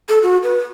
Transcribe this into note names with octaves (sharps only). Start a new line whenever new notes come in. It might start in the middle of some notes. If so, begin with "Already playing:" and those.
A4
F#4
B4